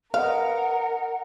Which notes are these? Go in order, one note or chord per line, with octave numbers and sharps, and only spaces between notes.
A#4 B4 D#5 F5 F#5